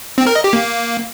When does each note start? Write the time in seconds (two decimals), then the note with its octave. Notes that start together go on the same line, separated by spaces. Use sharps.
0.18 C4
0.27 A#4
0.35 D#5
0.44 G4
0.53 A#3